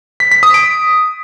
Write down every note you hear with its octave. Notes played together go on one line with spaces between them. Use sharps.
B6
B6
D#6
D7